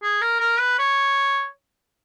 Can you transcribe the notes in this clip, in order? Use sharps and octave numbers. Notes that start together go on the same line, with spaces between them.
G#4
A#4
A#4
B4
C#5